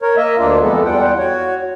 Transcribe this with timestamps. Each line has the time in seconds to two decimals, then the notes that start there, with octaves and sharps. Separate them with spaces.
0.02 A#4 C#5
0.17 A#3 D#5 E5
0.38 D2 A#3 D4 F4
0.62 F2 E3 G#3 B3 A4
0.85 E2 G3 F4 F#5 G5
1.18 F#4 C#5